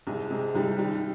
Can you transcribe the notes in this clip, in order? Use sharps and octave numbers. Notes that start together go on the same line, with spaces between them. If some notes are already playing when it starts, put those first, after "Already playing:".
C2 G#3
C3 G#3
C2 G3
D#3 G3